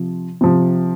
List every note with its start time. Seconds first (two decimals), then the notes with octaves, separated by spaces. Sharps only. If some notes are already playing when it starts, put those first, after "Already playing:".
Already playing: C3 F3
0.41 C3 F3